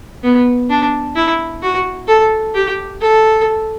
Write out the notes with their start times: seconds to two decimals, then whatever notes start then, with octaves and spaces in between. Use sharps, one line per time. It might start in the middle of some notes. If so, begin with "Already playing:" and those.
0.23 B3
0.70 D4
1.16 E4
1.62 F#4
2.08 A4
2.55 G4
3.01 A4